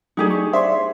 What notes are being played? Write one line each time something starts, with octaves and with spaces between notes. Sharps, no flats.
F#3 A3 D4 D#4 G4 G#4
C#6
C5 D5 E5 C6